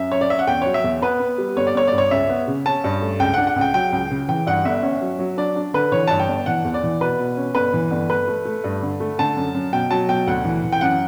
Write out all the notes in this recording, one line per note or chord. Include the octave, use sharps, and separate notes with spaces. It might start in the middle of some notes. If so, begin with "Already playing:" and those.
Already playing: F#2 E5
C#4 C#5
D5
C#4 E5
F#5
E2 G5
F#3 C#5
E5
E2
B3 B4
B3
G3
G1 C#5
D5
G1 C#5
G2 D5
C#5
C#2 E5
B3
C#3
C#4 A5
G2
A3
C#2 G5
F#5
D4
F#5
C#2
G5
F#3 G5
C#2
C#3
E3 G5
G2 F#5
G1 E5
C#4
F#3
F#3
D4 D5
D4
D3 B4
E3 C#5
G2 A5
G5
G1
E3 F#5
E2
D5
E3
B2 B4
B2
C#4
G1 B4
E3
G1
A3 B4
A3
A3
G2
D3
A3
D3 A5
F#2
F#2
B2 G5
F#3 A5
B2 G5
D2 F#5
E3
E3
G5
F#2 F#5